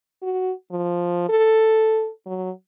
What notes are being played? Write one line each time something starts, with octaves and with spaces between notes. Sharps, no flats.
F#4
F3
A4
F#3